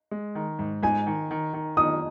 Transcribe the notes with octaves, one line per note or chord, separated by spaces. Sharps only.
G#3
D#3
G#2
G#2 G#5
D#3
D#3
D#3
D#3 D#6